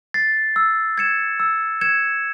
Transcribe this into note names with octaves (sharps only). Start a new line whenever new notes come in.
A6 C7
E6
G#6 C#7 E7
E6
G#6 C#7 E7